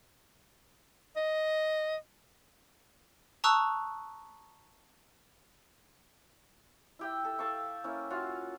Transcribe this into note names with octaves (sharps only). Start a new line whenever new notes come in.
D#5
A5 A#5 C#6 D#6 E6 F#6
E4 G4 G5
A4
A4 F5 C#6
A#3 C#4 E4
C#4 F4 F#4